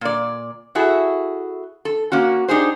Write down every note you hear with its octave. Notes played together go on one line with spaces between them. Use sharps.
A#2 D5
E4 F#4 G#4 A4 E5
A4
A#3 C#4 F#4
D4 D#4 G4 G#4 C5